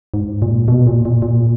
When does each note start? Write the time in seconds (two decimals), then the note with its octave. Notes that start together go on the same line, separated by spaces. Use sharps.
0.14 G#2
0.42 A#2
0.68 B2
0.87 A#2
1.05 A#2
1.22 A#2